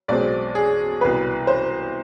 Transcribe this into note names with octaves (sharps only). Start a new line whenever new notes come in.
B1 B2 G#3 C4 D5
G#4
C2 B2 B3 B4
C5